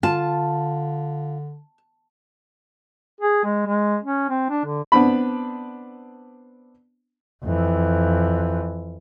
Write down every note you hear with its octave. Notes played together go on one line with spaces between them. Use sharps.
D3 F4 A5
G#4
G#3
G#3
C#4
C4
D4
D3
B3 C4 D4 B5
F2 E3